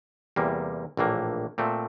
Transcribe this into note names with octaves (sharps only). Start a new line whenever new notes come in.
E2 C3 G3 A#3
A#1 A2 E3 A#3
A#2 A3 C4